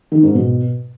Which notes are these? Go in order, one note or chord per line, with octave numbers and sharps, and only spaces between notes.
D#3
G#2
B2